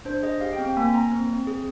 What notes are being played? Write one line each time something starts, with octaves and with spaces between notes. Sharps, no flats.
D4 C5
G#4 D#5
G4 F5
G5
C4
G5
A#3 G#5
A#3 A#5
C4
C4
G#4